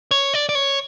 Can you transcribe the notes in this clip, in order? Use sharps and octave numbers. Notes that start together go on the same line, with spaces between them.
C#5
D5
D5
C#5